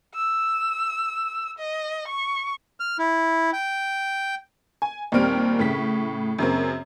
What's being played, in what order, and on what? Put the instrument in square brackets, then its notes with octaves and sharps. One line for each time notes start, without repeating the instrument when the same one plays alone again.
[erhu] E6
D#5
C#6
[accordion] F6
E4
G5
[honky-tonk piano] G#5
D#2 A#2 G3 C4 F6 D7
A2 C#3 B6
F#2 C#3 A#3 C4